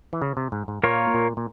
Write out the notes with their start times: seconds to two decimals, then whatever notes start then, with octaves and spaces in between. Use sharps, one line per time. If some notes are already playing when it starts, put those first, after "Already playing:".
0.13 E3
0.22 C#3
0.37 C3
0.52 G#2
0.68 G#2
0.83 A#2 A#3 F4 A#4 C#5
1.14 A#2
1.37 A#2